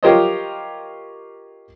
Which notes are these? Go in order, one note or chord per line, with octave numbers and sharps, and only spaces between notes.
F4 G4 A#4 C5 C#5 D#5